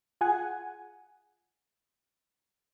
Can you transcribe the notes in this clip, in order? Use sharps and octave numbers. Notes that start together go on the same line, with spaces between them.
F4 G#4 F#5 G#5